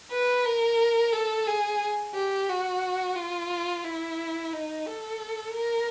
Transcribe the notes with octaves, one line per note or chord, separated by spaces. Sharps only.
B4
A#4
A4
G#4
G4
F#4
F4
E4
D#4
A4
A#4